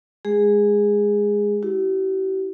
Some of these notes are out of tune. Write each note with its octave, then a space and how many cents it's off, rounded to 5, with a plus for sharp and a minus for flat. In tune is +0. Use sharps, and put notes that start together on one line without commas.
G#3 +0 G#4 -15
E4 -10 G4 -45